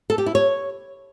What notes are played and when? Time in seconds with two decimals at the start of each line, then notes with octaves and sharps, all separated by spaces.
0.10 A4
0.18 G4
0.26 E4
0.35 C#5